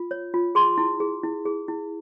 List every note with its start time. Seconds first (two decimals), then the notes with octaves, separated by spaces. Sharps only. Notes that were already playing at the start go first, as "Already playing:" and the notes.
Already playing: F4
0.11 C#5
0.34 F4
0.55 G#4 C6
0.78 E4
1.00 G#4
1.23 E4
1.45 G#4
1.68 E4